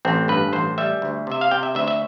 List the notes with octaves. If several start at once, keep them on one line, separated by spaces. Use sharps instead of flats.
A1 C4
G2 B4
A1 C5
G3 E5
D2
C3 E5
F5
C3 G5
E5
D2 E5
E5